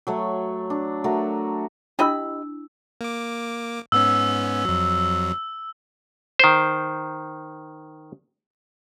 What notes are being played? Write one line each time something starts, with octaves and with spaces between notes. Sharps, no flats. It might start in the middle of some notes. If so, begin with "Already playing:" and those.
F#3 A3 C#5
D4
A3 F#4 A#4
D4 E4 G4 D#5 B5 E6
A#3 D6
G#2 B3 C#4 E6
F2 F#3
D#3 C5